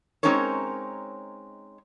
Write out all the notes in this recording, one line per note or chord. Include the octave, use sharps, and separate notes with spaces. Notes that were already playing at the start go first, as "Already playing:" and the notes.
G#3 C4 C#4 D#4 A#4 C#5